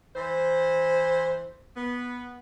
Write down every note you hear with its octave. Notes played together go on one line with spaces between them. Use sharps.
E3 C5
B3